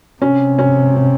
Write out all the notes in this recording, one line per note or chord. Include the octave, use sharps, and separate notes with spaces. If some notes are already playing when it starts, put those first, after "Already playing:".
C3 C#4
C#4
C#4